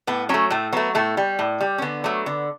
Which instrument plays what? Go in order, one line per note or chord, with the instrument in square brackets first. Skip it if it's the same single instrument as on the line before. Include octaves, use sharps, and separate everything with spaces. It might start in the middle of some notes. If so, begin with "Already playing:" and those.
[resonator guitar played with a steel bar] A2 B3
F#3 A3 C#4
A2 A3
F#3 A3 B3
A2 A3
G3
A2
G3
C#4
D3 B3
F#3 A3
D3